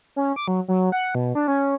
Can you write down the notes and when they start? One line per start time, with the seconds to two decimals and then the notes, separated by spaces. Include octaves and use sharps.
0.16 C#4
0.36 D6
0.48 F#3
0.68 F#3
0.92 F#5
1.15 B2
1.35 D4
1.48 C#4